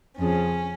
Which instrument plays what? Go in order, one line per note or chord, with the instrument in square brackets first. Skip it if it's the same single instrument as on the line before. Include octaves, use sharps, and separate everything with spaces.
[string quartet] F2 C#3 F3 C#4